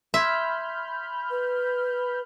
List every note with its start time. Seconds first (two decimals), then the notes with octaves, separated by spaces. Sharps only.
0.14 E5 B5 C6 F6 G6 G#6
1.30 B4